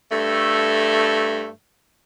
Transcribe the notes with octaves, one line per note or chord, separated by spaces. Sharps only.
G2 A3